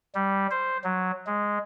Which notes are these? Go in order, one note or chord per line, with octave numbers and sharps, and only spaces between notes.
G3
C5
F#3
G#3